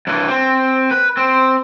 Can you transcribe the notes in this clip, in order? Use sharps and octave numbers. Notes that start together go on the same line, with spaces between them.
G2 E3
C4
B4
C4